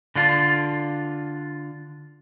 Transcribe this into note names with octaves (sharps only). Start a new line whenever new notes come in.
D3 D4 F4